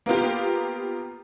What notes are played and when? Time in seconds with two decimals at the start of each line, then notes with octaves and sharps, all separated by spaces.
0.06 A#3 B3 F4 G4